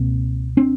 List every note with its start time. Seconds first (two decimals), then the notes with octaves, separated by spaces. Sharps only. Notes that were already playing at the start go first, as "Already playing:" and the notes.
Already playing: C#2 B2 A#3 C4
0.57 C4 D4